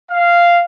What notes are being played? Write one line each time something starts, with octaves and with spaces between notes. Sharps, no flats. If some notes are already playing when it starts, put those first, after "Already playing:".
F5